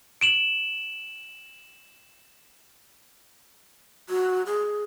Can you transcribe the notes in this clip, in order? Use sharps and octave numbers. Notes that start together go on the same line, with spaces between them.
D7 E7 F#7
F#4
G#4